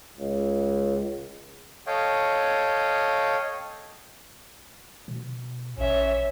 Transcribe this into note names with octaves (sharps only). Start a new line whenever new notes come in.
C#2
A4 C#5 D#5 F5 G5
B2
A1 C#4 E5